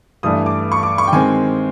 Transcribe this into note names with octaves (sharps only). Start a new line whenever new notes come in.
G2 E3 A3 D4 D#6
D6
C#6
D6
C#6
G5
D#3 G#3 C4 G#5